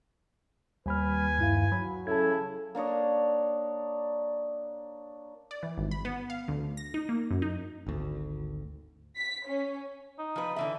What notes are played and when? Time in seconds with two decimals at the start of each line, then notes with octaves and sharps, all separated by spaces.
0.86 D#2 G3 B4 G#5 B5 F6
1.38 G2 E4 F5
1.72 F#3 B5
2.07 C#3 C#4 E4 A4 A5 G#6
2.75 A#3 D4 C#5 D#5
5.51 D5
5.63 E3
5.78 G#1
5.91 B5
6.05 B3
6.30 F5
6.48 D2
6.77 A#6
6.94 D#4
7.09 A#3
7.31 F#2
7.42 D#4
7.87 G#1 D2
9.17 B6
9.47 C#4
10.18 D#4
10.36 F3 B4
10.56 D3 E3 E5